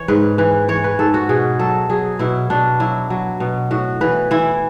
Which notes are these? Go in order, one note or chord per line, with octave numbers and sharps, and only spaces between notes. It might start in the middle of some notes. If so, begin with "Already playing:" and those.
Already playing: E3 C#5
G#2 B4
E3 B4
E3 C#5
B4
G#2 A4
F#4
B2 G#4
F#3 A4
F#3 G#4
B2 E4
B2 D4
F#3 E4
F#3
B2
A2 F#4
E3 B4
E3 E4